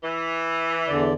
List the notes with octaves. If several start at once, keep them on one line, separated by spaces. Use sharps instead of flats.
E3
E2 D3 D5